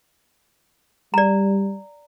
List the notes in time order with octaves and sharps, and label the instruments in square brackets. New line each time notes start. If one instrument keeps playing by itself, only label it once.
[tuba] G3 [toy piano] D5 A#5